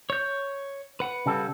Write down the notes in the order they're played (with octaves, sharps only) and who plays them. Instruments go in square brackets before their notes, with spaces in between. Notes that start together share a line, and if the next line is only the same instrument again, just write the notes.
[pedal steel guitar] C#5 G6
B4 F#5
[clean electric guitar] C#3 G3 A4